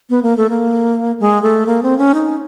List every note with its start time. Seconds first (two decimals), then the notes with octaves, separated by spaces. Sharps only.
0.10 B3
0.23 A#3
0.37 A3
0.50 A#3
1.20 G#3
1.43 A3
1.66 A#3
1.83 C4
1.98 C#4
2.14 D#4